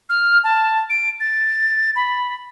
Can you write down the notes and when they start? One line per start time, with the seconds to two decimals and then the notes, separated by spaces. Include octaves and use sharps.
0.09 F6
0.44 A5
0.90 D7
1.20 A6
1.96 B5